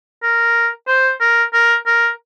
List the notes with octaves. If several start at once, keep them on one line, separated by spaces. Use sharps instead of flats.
A#4
C5
A#4
A#4
A#4